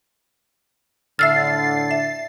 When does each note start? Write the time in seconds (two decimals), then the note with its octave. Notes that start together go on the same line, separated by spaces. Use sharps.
1.19 A2 D3 E5 E6 F6 A6 C7
1.91 E5